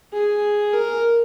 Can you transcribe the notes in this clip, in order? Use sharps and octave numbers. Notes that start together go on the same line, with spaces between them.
G#4
A#4